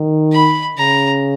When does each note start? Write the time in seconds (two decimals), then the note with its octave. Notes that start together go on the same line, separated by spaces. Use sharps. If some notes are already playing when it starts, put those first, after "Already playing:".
Already playing: D#3
0.32 B5
0.77 C#3 A#5